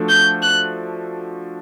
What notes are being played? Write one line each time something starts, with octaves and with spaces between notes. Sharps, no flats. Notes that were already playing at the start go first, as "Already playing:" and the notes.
Already playing: F3 A3 D4 F#4 A4
G6
F#6